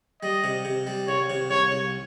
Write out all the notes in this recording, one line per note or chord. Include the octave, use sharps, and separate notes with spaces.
G3 D#5
C3
C3
G3
C2 C#5
C3
C2 C#5
C2